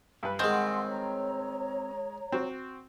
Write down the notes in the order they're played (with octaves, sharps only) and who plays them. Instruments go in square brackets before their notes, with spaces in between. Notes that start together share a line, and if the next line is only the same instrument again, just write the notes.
[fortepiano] G2 B4
[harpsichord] D#3 G#3 [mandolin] C4 [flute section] F#5 G#5 C6
[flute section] C#5 A#5
[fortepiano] C4 F#4